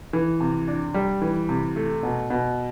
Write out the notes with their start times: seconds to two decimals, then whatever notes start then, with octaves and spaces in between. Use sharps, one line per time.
0.13 E3
0.41 C3
0.68 D4
0.94 G3
1.22 E3
1.49 C3
1.76 A3
2.03 B2
2.30 B2